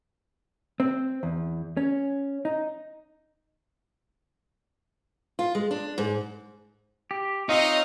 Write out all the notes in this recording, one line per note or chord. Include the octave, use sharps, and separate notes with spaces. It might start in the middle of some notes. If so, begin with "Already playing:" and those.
C4
E2
C#4
D#4
F4
G#3
D4
G#2
G4
C4 D#4 F4 C#5 D#5